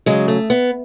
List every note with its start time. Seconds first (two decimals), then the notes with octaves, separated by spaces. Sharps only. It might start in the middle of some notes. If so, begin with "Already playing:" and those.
0.06 C#3 F#3 G#3
0.28 A3
0.50 B3